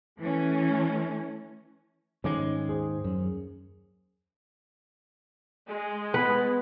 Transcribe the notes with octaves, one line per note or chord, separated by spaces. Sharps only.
E3 A3 C#4
G#2 D#3 G#3 C#4 D6
D#2 G#4 C5
F#2
G#3
B3 B4